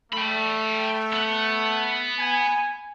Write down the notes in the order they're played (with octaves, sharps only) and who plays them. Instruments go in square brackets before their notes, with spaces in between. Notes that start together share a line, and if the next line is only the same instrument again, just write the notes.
[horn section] A3 [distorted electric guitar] G5 B5
[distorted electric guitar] B3 F#5
[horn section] G#5